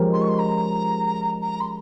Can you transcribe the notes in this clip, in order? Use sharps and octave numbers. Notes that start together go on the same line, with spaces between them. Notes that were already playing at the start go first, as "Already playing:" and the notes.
Already playing: F3 G#3 C#4 G4 A#4
C6
C#6
C6
A#5
A#5
C6